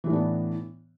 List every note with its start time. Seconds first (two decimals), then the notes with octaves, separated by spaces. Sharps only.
0.04 E3
0.07 A2
0.10 D4
0.13 B3